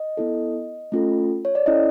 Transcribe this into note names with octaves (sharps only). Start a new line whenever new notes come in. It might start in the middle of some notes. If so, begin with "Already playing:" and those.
Already playing: D#5
B3 E4 A4
A3 C#4 F4 A4
C#5
D5
C#4 E4 A4 D#5